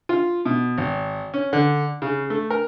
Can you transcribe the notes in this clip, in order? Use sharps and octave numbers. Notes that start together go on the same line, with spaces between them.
F4
B2
G#1
C#4
D3
C#3
A3
A#4